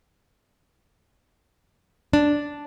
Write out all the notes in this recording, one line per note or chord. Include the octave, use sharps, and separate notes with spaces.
D4